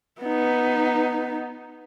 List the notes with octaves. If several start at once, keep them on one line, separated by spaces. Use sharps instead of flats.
B3 D#4